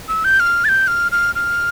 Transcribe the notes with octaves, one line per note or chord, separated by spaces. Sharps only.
E6
G6
F6
A6
G6
F6
F6
F6